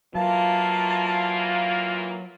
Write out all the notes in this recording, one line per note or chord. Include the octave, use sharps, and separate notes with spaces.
E3 F#3 A#3 F4 F5 A5